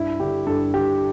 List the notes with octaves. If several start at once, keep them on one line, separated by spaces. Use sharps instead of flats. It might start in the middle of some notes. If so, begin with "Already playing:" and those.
Already playing: G2 E4
D3 G4
G2 A4
D3 G4